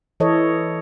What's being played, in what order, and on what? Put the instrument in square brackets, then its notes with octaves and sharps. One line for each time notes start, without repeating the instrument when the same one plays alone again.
[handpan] E3 E4 A4 C#5 D#5